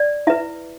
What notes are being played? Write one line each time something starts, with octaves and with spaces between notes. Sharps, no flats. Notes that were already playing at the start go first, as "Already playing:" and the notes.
Already playing: D5
E4 B4 E5